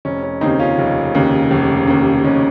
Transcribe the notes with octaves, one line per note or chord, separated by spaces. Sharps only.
F1 C#4
C#4
D#2 C#3 C4 D#4
C#4 F4
F1
D#2 C#3
F1
D#2 C#3
F1 C#4